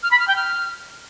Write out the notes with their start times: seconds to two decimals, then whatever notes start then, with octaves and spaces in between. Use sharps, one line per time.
0.03 F6
0.11 B5
0.20 F6
0.28 G5
0.36 F6